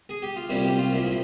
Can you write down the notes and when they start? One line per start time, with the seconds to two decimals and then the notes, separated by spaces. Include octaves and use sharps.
0.09 G#4
0.22 G4
0.36 F4
0.49 C2 A#2 G3 C#4 E4
0.64 G4
0.78 F4
0.93 A#1 A#2 F3 E4